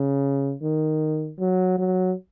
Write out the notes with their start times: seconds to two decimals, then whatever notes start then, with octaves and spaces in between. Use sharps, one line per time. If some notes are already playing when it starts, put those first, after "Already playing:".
Already playing: C#3
0.62 D#3
1.39 F#3
1.78 F#3